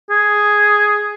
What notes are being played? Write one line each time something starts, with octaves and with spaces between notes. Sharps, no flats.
G#4